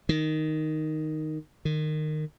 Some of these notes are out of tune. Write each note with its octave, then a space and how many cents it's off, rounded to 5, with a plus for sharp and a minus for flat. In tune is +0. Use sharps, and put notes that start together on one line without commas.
D#3 +0
D#3 -20